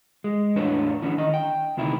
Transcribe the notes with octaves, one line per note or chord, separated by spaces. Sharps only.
G#3
E2 A2 D4 B4 C#5
E3 C#4 D4
D#3 D#5
G5
D2 C3 D#3 E4